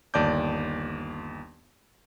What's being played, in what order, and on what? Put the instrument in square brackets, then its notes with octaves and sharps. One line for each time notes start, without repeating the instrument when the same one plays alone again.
[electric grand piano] G1 D#2 D5 A5 D6 G6